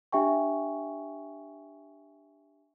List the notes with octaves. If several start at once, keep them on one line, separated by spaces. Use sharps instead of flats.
D4 G4 E5 G5 G#5 C#6